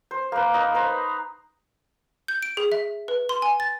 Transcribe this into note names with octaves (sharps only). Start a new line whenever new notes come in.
C5
A#3 B4
D#4
B4 C5 A#5 B5
G6
D7
G#4
E5
B4
C6
G#5
A6